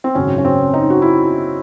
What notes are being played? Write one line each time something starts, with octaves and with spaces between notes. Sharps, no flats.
C4
G#1 F#2 C#3 F#3 C#4
C#4
C4
D#4
F#4
E4